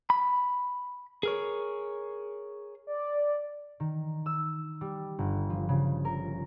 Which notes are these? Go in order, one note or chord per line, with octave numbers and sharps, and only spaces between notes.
B5
G#4 A#4 C#5
D5
D#3
E6
G3
G1
F3
C#3
A#4